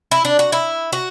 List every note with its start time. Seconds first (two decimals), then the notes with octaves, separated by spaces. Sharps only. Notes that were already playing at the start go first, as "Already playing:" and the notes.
0.11 E4
0.25 D4
0.39 F#4
0.52 E4
0.93 F#4